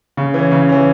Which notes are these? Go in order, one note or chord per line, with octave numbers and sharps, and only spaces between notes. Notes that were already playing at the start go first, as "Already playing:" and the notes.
C#3
E3 C#4
C#3
E3 C#4